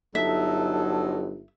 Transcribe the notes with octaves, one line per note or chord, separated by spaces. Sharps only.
G1 F#3 D#4 A4 E5